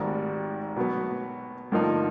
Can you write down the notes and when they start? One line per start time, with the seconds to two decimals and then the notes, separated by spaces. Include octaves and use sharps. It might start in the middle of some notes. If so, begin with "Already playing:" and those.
Already playing: G#1 G#2 D#3 G3
0.77 B2 F#3 B3
1.72 G2 D3 F3 A#3 D#4